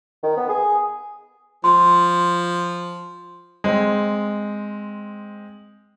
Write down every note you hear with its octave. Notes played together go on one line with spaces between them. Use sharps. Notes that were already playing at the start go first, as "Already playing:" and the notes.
D#3
B3
G#4
F3 C6
G#3 C4